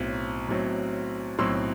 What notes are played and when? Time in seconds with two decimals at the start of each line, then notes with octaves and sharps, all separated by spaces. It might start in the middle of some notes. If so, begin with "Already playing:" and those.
Already playing: B1 A2 F#3 C4
0.49 B1 A2 F#3 C4
1.39 B1 A2 F#3 C4 C6 E6